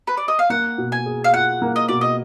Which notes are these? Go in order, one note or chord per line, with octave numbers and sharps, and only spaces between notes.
B4
D5
D#5
F5
A#3 F#5
B2
G#5
G#4
F5
F4 F#5
A#3
D#5
B2 D5
D#5